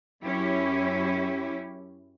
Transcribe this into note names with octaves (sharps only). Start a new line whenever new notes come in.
F#2 C#4 E4 G4